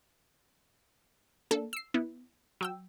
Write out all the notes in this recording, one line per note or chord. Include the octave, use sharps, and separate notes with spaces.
A#3 D4 A4
E6 C7
B3 E4
F#3 G5 E6